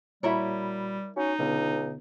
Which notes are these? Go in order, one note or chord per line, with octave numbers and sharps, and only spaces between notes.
A#2 G3 E4 F#4 A#4 C#5 B5
C#4 D#4 F#4
C#2 B2 D3 B3